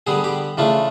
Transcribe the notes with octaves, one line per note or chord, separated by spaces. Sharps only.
D3 G3 B3 G#4
G4
C#3 E3 A3 D4 F4